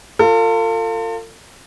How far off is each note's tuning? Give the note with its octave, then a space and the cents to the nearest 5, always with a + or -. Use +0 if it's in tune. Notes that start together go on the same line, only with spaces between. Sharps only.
F4 +0 A4 +40